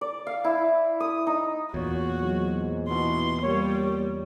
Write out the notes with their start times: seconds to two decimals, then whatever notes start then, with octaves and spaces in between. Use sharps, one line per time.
0.01 D5
0.27 F5
0.44 E4
1.00 D#6
1.27 D#4
1.74 E2 A#2 F#4 C#5
2.21 G#2 F#3
2.89 B2 E3 C6
3.43 G3 A#3 C#5